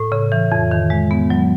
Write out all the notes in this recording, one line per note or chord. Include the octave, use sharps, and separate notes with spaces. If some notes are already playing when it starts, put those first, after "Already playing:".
Already playing: A2
C#3
E3
F2
D#3
G#3
B3
F#3